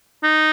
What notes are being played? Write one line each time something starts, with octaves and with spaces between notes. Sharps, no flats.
D#4